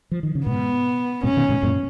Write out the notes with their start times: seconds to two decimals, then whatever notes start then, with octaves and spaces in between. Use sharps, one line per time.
0.11 F3
0.23 D#3
0.35 C#3
0.46 G#2 B2 B3
1.23 G#2 B2 C#4
1.37 B2 D#3
1.49 G#2 B2
1.63 F#2 A#2